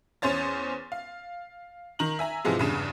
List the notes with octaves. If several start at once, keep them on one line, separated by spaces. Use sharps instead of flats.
E2 C#4 C5 C#5 A6
F5
D#3 A#5 F#7
E5 G#5 A#5
G#2 C3 E3 F3 G#3
E2 G2 C#3